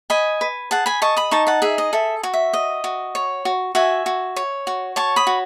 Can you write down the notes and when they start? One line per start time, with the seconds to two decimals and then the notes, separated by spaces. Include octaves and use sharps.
0.10 D#5 G#5 B5
0.41 B4
0.71 G#4 F#5 A5
0.86 G#5 B5
1.02 D#5 A5 C#6
1.17 B5 D#6
1.31 D#4 A5 C#6
1.47 F#5 A5
1.62 G#4 E5
1.78 D#5
1.93 A4 E5
2.23 F#4
2.34 E5
2.53 D#5
2.84 F#4
3.15 C#5
3.45 F#4
3.75 F#4 E5 G#5
4.06 F#4
4.36 C#5
4.67 F#4
4.96 C#5 A5 C#6
5.16 B5 D#6
5.27 F#4